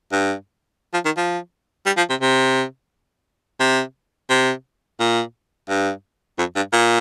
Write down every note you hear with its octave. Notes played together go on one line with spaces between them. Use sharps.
G2
F3
D#3
F3
G3
F3
C3
C3
C3
C3
A#2
G2
F2
G2
A#2